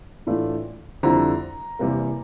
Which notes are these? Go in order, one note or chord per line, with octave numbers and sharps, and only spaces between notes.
A2 E3 A3 D4 F4
F2 D3 G3 C4 E4 A#5
E2 C3 G3 A#3